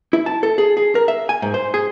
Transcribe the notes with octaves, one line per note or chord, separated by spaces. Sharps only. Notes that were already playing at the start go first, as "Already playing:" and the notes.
E4
A5
A4
G#4
G#4
A#4
E5
G#5
G#2
C5
G#4